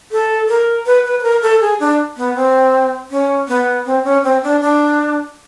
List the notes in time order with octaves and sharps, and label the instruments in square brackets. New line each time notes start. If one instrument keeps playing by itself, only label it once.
[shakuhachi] A4
A#4
B4
B4
B4
A#4
A4
G#4
D4
B3
C4
C#4
B3
C4
C#4
C4
D4
D4